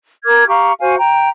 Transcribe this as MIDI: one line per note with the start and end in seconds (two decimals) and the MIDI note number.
0.25 0.47 70
0.25 0.47 86
0.25 0.47 89
0.25 0.47 92
0.48 0.72 67
0.48 0.72 77
0.48 0.72 82
0.48 0.72 85
0.80 0.96 66
0.80 0.96 72
0.80 0.96 77
0.80 0.96 80
0.98 1.29 79
0.98 1.29 82